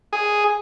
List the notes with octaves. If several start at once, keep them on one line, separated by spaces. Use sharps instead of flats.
G#4